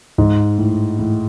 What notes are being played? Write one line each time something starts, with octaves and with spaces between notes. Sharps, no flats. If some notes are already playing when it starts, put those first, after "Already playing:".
G#2
A2
A2